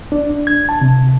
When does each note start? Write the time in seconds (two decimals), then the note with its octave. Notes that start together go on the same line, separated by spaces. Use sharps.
0.12 D4
0.30 D4
0.47 G#6
0.69 A5
0.81 C3